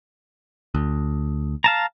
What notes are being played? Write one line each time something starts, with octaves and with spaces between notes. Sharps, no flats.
D2
F5 A5 A#5